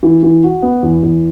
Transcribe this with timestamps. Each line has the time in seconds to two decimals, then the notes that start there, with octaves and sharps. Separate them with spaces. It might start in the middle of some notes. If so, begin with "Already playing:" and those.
0.03 E3
0.23 E3
0.43 F#4
0.62 B3
0.83 E2
1.03 E2